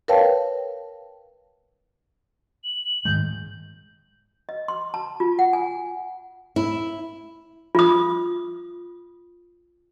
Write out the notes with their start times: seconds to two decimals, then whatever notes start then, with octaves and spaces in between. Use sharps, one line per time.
0.08 A#4 B4 C#5 F5 G5 A5
2.64 F#7
3.05 G#2 D#3 G#3 G6
4.49 D#5
4.68 C6
4.94 A5
5.20 F4
5.39 F#5
5.53 G#5
6.56 E4
7.75 F4 D#6